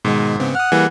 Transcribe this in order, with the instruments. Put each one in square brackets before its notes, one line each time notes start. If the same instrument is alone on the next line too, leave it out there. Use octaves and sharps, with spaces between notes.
[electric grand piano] G#2 [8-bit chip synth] B2 D#3 G#3
[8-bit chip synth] C#3 B3 C4
[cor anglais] F#5 [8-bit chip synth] D#6 F6
[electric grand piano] E3 [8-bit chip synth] G3 A#3 G#4